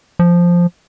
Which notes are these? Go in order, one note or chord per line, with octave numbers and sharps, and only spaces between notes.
F3